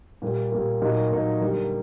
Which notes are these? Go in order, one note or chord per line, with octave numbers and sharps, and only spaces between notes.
A#2 G3 A#3
A#2 G3 A#3
A#2 F#3 A#3 D#4
A#2 F#3 A#3 D#4
D3 G3 A#3